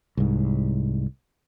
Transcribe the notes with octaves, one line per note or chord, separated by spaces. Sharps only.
C2 G#2